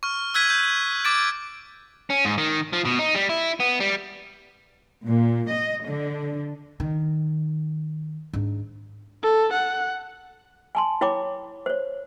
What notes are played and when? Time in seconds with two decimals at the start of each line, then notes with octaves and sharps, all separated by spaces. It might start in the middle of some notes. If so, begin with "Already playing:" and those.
0.03 C#6 F6
0.34 E6 F#6 G#6 B6 D#7
0.50 G6
1.05 D6 A6 D7
2.10 C#4
2.25 G#2
2.38 D#3
2.73 F3
2.85 B2
2.99 D#4
3.15 G3
3.29 E4
3.60 B3
3.80 G3
5.07 A#2
5.52 D#5
5.86 D3
6.80 D#3
8.33 G#2 D4
9.23 A4
9.53 F#5
10.75 G#5 A5 C6
11.01 E4 C#5 G5 B5 D6
11.66 C5 C#5